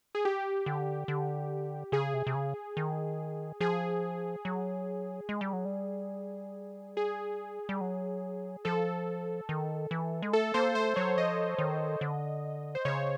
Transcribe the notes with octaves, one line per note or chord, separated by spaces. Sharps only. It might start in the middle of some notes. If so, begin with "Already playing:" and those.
G#4
G4
D3
D3
C#3 G#4
C3
C3
C#3
D#3
F3 G#4
F#3
G#3
G3
F#3
G3
G#4
G3
F#3
F3 A4
D#3
E3
G#3
A3 A4
A#3 C5
A3 C5
F#3 C#5
F3 D#5
D#3
D3
C5
C#3 C#5